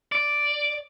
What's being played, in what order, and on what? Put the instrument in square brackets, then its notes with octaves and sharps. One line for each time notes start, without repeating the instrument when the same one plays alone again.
[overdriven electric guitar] D5